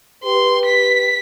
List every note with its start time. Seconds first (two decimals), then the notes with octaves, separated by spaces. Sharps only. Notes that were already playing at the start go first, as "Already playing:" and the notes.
0.24 G4 B4 C6
0.66 B6